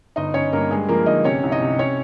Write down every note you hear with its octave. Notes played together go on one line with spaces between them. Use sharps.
G1 D#4 D#5
G1 C#4 C#5
G2 A#3 A#4
G2 G#3 G#4
F3 A#3 A#4
G1 D#4 D#5
C3 C#4 C#5
C2
D#4 D#5
C3
C#4 C#5